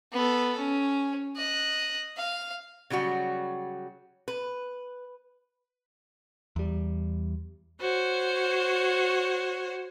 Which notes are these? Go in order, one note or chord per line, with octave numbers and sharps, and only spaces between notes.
B3 A4
C#4
D#5 F#6
F5
C#3 F#3 G3 F#4
B4
E2 G3
F#4 C5 C#5